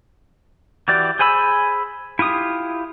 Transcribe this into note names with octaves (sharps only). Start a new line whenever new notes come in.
E3 F#4 G4 D5
G#4 C5 G#5 B5 E6
E4 F4 G4 D#6